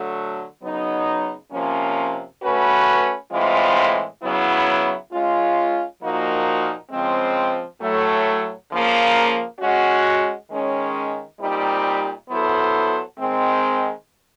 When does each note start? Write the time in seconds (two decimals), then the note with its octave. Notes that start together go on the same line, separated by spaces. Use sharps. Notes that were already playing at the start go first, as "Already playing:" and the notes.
Already playing: D3 F#3 A3
0.62 C#3 F#3 B3 D#4
1.51 C3 F3 A#3 C#4
2.42 A3 C#4 F#4 B4
3.31 A2 E3 G#3 C4 F4
4.22 C#3 F#3 B3 E4
5.11 G#3 C#4 F4
6.01 A#2 F3 A#3 D#4 F#4
6.91 C#3 F3 G#3 C4
7.80 A2 F#3 A3
8.70 C#3 F3 A#3
9.59 G#3 C#4 F#4
10.49 D#3 G#3 C#4
11.39 A#2 G3 C4 D#4 G4
12.29 F#3 B3 E4 A4 C5
13.18 D#3 G#3 C4